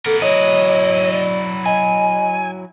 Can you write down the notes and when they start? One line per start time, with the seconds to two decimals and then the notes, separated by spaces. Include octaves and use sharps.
0.06 B3 A4 A#4
0.22 F#3 E4 C#5 D#5
1.11 D5
1.66 D#5 G#5